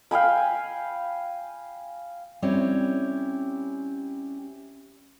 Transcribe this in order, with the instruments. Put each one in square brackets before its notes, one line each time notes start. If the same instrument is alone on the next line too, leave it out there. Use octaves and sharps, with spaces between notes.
[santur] F5 G5 G#5 B5
[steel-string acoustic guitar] G3 C4 C#4 E4 G4 C#5